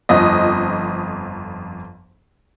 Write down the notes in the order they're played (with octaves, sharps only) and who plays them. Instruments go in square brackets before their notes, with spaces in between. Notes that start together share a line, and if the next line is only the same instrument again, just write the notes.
[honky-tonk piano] G1 F2 D#5